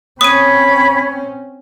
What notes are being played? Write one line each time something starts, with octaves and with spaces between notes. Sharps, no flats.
C4 C#4 C#5 B5 D#6 D#7